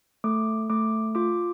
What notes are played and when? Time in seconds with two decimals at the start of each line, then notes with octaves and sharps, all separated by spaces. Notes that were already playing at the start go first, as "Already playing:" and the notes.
0.24 A3 D6
0.70 A3 D6
1.15 F4 D6